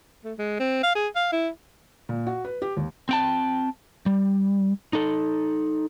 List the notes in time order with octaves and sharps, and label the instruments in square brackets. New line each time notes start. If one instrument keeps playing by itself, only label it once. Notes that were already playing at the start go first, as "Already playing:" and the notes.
[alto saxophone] A3
G#3
C4
F5
G#4
F5
E4
[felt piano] A#2
F#4
B4
G4
D#2
[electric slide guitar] C4 G5 A5
G3
D#4 A4